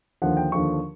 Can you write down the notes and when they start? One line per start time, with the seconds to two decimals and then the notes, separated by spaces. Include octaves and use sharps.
0.22 D#2 D3 F3 F#5
0.37 G5
0.52 D#2 D3 F3 C#6